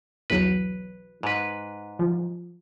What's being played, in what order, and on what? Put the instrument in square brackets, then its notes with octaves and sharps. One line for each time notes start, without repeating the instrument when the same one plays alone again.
[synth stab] B1 E2 F#3 [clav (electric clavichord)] B4
[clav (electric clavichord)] G#2 B4
[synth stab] F3